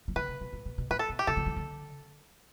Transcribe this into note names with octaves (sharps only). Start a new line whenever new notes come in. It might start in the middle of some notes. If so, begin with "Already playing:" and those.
E3
D3 B4
C3
B2
A2
B2
B2
A2 B4
A4
B2
G4
C3 A4
D3
E3
D3